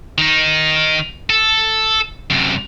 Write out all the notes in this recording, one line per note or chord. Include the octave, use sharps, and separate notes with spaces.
D#3 D#4
A4
F#2 C3